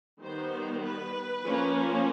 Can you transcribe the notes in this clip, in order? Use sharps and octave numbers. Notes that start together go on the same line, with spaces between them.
D#3 G3 B3 C5
B4
F3 A#3 C#4